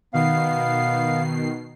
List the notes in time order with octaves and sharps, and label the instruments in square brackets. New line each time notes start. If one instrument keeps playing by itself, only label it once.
[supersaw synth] B2 D#3 C7 [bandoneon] B3 F5